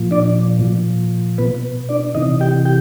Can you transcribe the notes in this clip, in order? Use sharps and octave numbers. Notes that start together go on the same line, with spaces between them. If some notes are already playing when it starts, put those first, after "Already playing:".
Already playing: A#2 F3
D4 D5
A#2 F3
B2 B3 B4
D4 D5
C3 E3 D#4 D#5
G4 G5
G4 G5